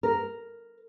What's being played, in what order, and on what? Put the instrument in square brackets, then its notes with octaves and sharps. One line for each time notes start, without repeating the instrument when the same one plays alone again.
[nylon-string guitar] A#4